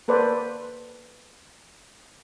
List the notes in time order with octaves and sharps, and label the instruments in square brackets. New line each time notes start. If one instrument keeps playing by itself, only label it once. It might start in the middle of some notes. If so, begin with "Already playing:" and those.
[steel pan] A#3 A4 B4 C5 D5